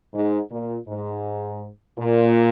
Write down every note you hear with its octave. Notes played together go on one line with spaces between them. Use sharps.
G#2
A#2
G#2
A#2